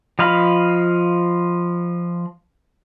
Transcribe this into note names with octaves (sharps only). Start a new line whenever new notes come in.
F3 D#5 F5 B5